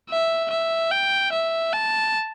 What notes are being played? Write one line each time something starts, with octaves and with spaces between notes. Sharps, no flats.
E5
E5
G5
E5
A5